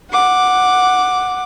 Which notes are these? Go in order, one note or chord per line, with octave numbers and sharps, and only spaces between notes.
F#5 D6